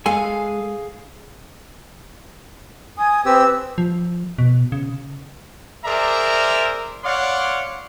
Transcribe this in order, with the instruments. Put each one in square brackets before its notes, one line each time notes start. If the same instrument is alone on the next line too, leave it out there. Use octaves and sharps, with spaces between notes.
[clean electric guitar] G#3 A4 G#5 [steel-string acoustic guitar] G#4 F5
[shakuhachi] G#5 [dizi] D#6
[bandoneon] C4 G4 [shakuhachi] B4 [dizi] E6
[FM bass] F3
B2
C#3
[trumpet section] G#4 A#4 C5 D5 E5 A#5
C#5 D5 F5 F#5 C6 D6